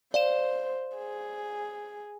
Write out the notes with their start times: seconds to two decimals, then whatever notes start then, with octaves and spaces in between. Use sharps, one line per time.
0.14 C5 D5 F5 E7
0.97 G#4